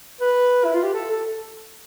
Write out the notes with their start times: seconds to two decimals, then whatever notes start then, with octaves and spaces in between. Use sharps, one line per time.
0.21 B4
0.64 E4
0.74 F4
0.83 G4
0.94 A4
1.11 A4